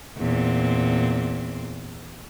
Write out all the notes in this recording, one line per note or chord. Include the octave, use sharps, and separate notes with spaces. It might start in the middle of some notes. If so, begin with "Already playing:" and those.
E2 A#2 C4